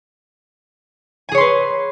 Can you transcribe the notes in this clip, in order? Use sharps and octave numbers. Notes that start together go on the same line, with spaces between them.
G#4 B4 C#5 G#5 C6